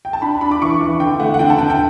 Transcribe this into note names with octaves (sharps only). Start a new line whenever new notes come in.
G5
A5
D4 B5
D4 B5
D6
E3 C#6
E3
D3 G5
A3 F#5
F#5
D3 G5
A5
D3 G5
G5